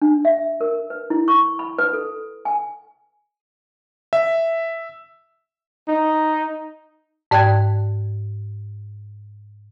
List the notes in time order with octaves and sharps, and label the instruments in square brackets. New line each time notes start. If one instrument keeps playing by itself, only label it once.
[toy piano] D4
E5
A#4
B4
E4
C#6
B5
B4
A4
G#5
[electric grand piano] E5
[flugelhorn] D#4
[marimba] G#2 D5 G5 F#6 G#6